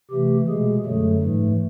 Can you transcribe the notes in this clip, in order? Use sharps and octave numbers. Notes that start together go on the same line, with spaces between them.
C3 E3 A3 G4
B2 G#3 G#4
F#2 D3 F#3 A3
G#2 E3 A3